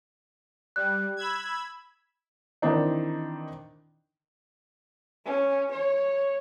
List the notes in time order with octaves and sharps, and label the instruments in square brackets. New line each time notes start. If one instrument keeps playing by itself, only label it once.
[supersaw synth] G3 [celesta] F#6
[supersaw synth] B5 E6 G#6
[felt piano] D#3 E3 C4 D4 D#4
[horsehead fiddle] C#4
C#5